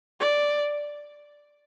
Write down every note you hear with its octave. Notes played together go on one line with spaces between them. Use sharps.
D5